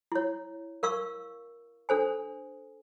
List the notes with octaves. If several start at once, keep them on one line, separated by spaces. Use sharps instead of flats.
E4 C#5
A#4 F5 C#6 E6
D4 A4 C5 G#5